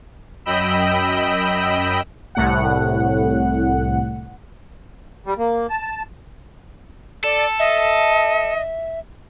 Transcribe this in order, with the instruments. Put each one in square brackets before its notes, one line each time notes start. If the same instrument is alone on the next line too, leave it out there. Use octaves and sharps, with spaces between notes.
[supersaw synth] F#2 D#5 G5 B5 E6
[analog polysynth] C2 A2 F#5
[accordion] G3
A#3
A5
[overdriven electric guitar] A4 [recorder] D5
[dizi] D#5 [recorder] E5